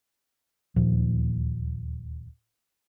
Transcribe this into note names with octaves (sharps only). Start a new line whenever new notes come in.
D1 D#2 A#2 F3